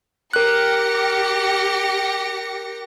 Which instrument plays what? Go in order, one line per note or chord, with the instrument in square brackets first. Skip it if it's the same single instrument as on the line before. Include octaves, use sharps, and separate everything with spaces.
[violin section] G4 A#6 C#7 [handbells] A#4 F#6